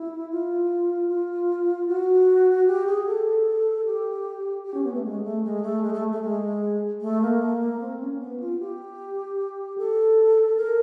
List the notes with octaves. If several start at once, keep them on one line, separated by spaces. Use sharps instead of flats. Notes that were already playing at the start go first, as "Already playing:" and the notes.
Already playing: E4
F4
F4
F#4
G4
G#4
A4
G4
G4
C#4
B3
A3
G#3
A3
G#3
A3
G#3
A3
A3
G#3
A3
A#3
C4
C#4
B3
F4
G4
A4
A#4